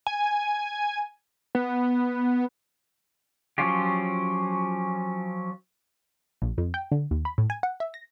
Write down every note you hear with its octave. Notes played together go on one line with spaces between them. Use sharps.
G#5
B3
F3 F#3 C#4 F4 G4
A#1
F2
G5
D3
D#2
B5
A2
G#5
F#5
E5
A#6